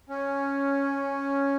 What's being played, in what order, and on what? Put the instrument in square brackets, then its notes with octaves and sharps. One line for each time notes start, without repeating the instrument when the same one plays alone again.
[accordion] C#4